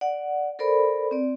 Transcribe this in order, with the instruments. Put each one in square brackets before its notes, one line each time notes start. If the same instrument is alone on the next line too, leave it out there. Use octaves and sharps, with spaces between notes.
[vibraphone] D5 F#5
A4 A#4 C5 D5 B5
C4 D5